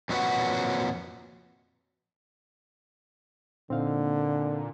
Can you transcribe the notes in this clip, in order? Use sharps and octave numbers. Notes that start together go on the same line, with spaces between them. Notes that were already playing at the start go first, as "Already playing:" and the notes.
F2 A#2 F#3 F#4 B4 F#5
A#2 D3 C4 D#4 F5